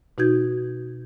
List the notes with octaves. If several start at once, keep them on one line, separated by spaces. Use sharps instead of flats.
B2 D#4 F#4 G6 G#6